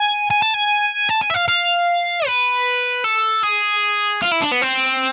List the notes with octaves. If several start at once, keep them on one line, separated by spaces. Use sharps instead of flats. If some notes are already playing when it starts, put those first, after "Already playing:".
Already playing: G#5
G#5
A5
G#5
A5
G#5
E5
F5
F5
B4
A4
G#4
F4
E4
D4
B3
C4